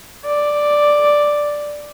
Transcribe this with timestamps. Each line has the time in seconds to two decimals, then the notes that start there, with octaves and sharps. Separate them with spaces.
0.25 D5